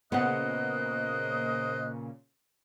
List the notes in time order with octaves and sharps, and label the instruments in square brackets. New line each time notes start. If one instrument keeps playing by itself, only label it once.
[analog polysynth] A#2 C#3 [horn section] A#3 C5 D#5 [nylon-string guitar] B3 F#5 [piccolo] F#6